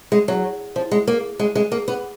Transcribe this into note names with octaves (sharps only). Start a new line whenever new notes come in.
G#3
F#3
F3
G#3
A#3
G#3
G#3
A#3
B3